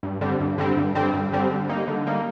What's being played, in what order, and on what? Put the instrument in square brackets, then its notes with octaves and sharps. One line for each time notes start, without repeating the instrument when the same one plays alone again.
[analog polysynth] G2
D3 G3 C4
G2
D3 G3 C4
G2
D3 G3 C4
G2
D3 G3 C4
D3
G3 A#3 D#4
D3
G3 A#3 D#4